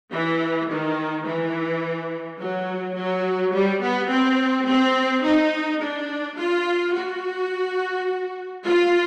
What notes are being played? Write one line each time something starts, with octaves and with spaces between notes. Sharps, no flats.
E3
D#3
E3
F#3
F#3
G3
B3
C4
C4
D#4
D4
F4
F#4
F4